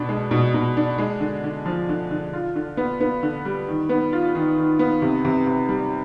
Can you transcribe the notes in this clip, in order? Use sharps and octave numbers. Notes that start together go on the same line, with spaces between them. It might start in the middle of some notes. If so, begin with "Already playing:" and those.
Already playing: B2 D4
G#3
B2
B2
D4
G#3
D3
D3
F3
D3
D3
F4
D3
B3
B3
D3
G3
D#3
B3
F4
D#3
D#3
B3
C3
C3
C3
G3